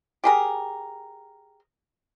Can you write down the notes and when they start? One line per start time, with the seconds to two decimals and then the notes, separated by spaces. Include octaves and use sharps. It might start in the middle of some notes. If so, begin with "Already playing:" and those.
0.24 G4 G#4 A#4